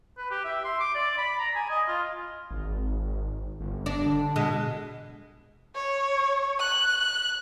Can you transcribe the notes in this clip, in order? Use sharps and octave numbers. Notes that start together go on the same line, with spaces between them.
B4
G4
E5
C6
D6
D5
B5
A#5
G#5
D#5
F4
G#1
G1
D4
D3
B2 G#3
C#5
F#6
F#6